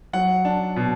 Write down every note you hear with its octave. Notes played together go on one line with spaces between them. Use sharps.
F#3 F#5
D4
B2